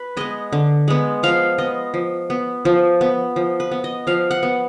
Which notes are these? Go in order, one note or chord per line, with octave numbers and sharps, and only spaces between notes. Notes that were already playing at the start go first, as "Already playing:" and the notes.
Already playing: B4
G#3 B3 D#5
D3
G#3 B3
F3 F5
B3 D#5
F3
B3
F3
B3
F3
B4
B3
D#5
F3 F5
F#5
B3